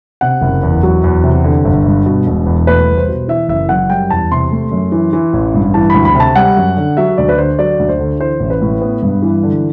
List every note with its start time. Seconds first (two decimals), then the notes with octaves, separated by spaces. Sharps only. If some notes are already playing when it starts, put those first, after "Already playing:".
0.21 C3 F#5
0.41 F#1
0.63 E2
0.83 F#3
1.04 E2
1.24 C3
1.44 D3
1.65 G1
1.86 G2
2.06 B2
2.26 E1
2.47 E2
2.67 A3 B4
2.88 C2
2.97 C5
3.09 B2
3.28 E3 E5
3.48 F#1 E5
3.69 F#2 F#5
3.90 G3 G5
4.10 E2 A5
4.32 C3 C6
4.52 A3
4.72 F#2
4.92 E3
5.13 E3
5.33 A1
5.54 G2
5.74 E3 A5
5.90 D2 B5
6.05 B5
6.15 C3
6.20 A5
6.36 G3 F#5
6.57 F#2
6.77 D3
6.97 F#3 E5
7.18 D2 D5
7.29 B4
7.38 D3 C5
7.59 F#3 D5
7.79 D2
7.89 C5
7.99 D3
8.20 E3 C5
8.40 A1
8.50 B4
8.62 A2
8.81 B3
9.03 G2
9.22 E3
9.43 D3